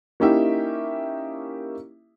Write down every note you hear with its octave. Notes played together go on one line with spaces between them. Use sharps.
A#3 C#4 D#4 E4 G4 E5